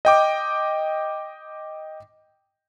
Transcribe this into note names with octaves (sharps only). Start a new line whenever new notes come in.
D#5 G5 D6